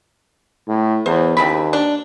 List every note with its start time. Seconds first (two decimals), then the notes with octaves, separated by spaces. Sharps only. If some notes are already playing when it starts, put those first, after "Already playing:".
0.68 A2
1.06 E2 C5
1.37 D#2 C#3 C4 B5
1.73 D4